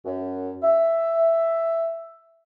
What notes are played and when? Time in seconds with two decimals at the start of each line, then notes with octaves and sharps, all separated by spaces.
0.05 F#2
0.62 E5